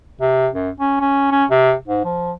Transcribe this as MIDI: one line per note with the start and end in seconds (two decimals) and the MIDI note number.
0.21 0.48 48
0.54 0.69 42
0.80 0.98 61
1.00 1.29 61
1.32 1.45 61
1.50 1.73 48
1.87 2.02 44
2.05 2.32 53